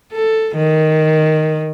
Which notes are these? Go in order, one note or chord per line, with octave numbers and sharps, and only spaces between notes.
A4
D#3